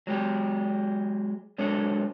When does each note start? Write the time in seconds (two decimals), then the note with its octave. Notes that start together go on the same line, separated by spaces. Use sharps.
0.07 F#3 G#3 G4
1.58 F#3 G#3 D4 A4 C#5